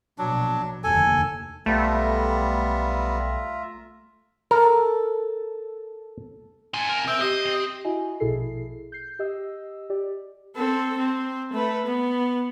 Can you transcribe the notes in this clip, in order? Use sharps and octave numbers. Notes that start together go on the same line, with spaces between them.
A#1 B2 F#3 D4
F1 D#2 D3 A4 G#5
B1 G3 A3 B3 F4 E5 A#5
A4 A#4
C3 D#4 G#5 C6
A#4
C4 E5
G4 C5 D#5
C4
E4 F#4 D#5 G#5
A#1 B2 E4 G#4 A4 C7
G6 C7
G4 D#5 E6
G4 D5
C4 A4
C4
A3 B4
B3